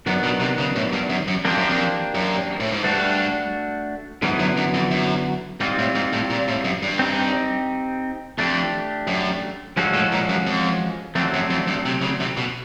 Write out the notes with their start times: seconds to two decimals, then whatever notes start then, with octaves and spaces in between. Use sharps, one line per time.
0.07 F#2 D#3 F#3 B3 D4
0.23 B2
0.40 C3
0.59 C#3
0.76 A2
0.93 G2
1.10 F#2
1.28 F#2
1.45 F2 A#3 D4 G4 C5
1.57 F#2
1.69 F2
2.15 F#2
2.60 A2
2.72 G#2
2.83 G2 A3 D4 F#4
4.22 G#2 D3 F#3 B3 E4
4.39 F#2
4.57 F#2
4.74 F2
4.91 F#2
5.60 G#2 G3 C4 F4
5.79 A2
5.95 G#2
6.13 A2
6.30 A#2
6.48 A2
6.64 F#2
6.83 G2
6.99 C4 D#4 G4
8.38 F2 A3 D4 G4
9.07 F#2
9.77 G2 F3 G#3 C#4 F#4 A4
9.94 A2
10.12 A#2
10.29 F#2
10.47 F2
11.15 F2 F#3 A3 C4
11.34 F#2
11.50 F2
11.67 G2
11.86 C3
12.02 C#3
12.20 C3
12.37 B2